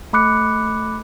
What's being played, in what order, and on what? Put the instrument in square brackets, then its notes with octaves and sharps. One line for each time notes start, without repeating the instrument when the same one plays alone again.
[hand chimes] A3 B5 D6 F#6 C#7